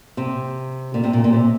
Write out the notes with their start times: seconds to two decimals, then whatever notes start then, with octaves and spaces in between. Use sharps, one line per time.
0.17 C3
0.94 A#2
1.04 C3
1.13 A#2
1.24 A#2
1.33 C3